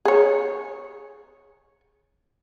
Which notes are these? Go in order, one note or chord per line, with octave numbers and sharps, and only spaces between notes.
G#4 C#5